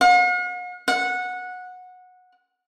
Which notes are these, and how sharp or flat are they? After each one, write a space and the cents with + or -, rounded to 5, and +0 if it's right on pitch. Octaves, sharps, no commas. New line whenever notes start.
F#5 -45
F#5 -15